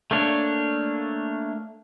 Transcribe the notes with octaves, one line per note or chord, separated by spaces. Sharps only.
A3 A#3 D4 C#5